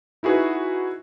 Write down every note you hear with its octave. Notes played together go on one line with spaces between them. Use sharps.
D#4 E4 F#4 G#4 B4